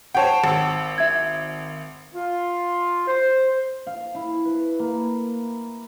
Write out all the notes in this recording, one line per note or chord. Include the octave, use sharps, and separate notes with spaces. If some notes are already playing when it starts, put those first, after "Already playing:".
C5 C#5 F#5 G5 A5
G#1 E6
E5 G#6
F4
C5
F5
E4
B4
A#3